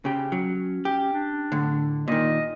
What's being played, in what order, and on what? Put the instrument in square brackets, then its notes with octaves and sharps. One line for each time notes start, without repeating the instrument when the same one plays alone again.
[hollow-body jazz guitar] C#3 G4 [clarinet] C#4
[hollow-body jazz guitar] F#3
G4
[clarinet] D4
[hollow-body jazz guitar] A2 D3
[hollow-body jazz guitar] A#2 D#3 [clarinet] D#5